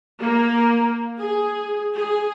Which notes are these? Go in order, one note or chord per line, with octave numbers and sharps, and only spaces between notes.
A#3
G#4
G#4